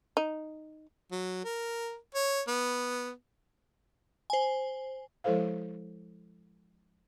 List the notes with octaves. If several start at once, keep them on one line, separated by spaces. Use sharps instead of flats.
D#4
F#3
A#4
C#5
B3
C5 G#5
F3 G#3 E4 A4 C5 F5